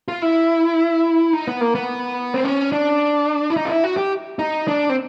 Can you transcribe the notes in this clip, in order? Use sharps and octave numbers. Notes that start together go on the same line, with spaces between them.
F4
E4
D#4
B3
A#3
B3
C4
C#4
D4
E4
D#4
F4
E4
F#4
G4
D#4
D4
C4